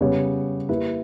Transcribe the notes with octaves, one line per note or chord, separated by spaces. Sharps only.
C#3 G3 B3 G4 C#5
A#3 E4 G4 B4